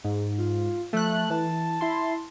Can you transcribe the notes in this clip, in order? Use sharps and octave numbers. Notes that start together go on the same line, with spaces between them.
G#2
F4
F3 A3 F#6
E3 A5
E4 C6